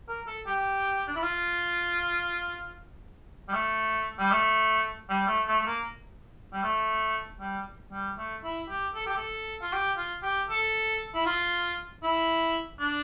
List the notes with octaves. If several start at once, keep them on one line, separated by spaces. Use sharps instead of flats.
A#4
A4
G4
D4
E4
F4
G3
A3
G3
A3
G3
A3
A3
A3
A#3
G3
A3
G3
G3
A3
E4
G4
A4
G4
A4
F4
G4
F4
G4
A4
E4
F4
E4
D4